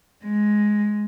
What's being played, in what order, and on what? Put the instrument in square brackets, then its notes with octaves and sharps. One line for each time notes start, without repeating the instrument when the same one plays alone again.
[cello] G#3